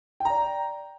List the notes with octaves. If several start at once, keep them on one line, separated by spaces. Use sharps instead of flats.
D5 G5 A#5